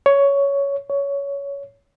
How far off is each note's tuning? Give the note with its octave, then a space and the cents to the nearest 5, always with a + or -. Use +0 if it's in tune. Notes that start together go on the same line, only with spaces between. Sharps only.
C#5 +10
C#5 +15